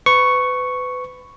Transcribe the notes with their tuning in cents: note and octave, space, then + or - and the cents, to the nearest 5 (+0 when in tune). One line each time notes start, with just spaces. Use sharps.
B4 +30 C#6 +0